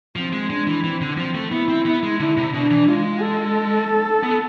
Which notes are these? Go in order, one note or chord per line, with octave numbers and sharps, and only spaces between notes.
F3 C4
G#3
G#3 D4
E3
E3 C4
D3
F3 C4
A3
B3 E4
C4
B3
G#3
D3 E4
C3
B2 D4
E3
G#3 F4
A4
B3